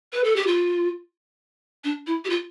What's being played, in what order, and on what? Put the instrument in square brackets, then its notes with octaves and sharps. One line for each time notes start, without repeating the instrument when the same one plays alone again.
[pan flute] B4
A4
G4
F4
D4
E4
G4
F4